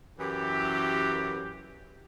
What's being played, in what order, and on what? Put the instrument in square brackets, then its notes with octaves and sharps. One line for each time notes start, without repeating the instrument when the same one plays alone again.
[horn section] F#2 E3 G4